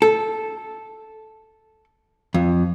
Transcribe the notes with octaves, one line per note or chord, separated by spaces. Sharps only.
A4
F2